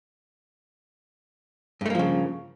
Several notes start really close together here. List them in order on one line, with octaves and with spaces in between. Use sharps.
G2 A3 A#3 F3 C#3